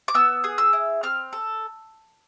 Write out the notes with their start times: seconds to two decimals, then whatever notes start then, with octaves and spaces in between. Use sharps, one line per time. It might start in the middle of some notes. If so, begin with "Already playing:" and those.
0.08 D6
0.14 B3 E6
0.44 G#4
0.58 E6
0.73 E4
1.03 C4 F6
1.33 A4